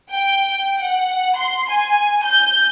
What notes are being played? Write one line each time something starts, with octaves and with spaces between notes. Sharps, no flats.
G5
F#5
C6
G#5
G6